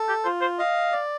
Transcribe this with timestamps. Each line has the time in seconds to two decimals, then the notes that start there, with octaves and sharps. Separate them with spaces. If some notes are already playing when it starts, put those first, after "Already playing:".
Already playing: A4
0.09 G4
0.24 F4 C5
0.41 C5
0.59 D#5 F5
0.92 D5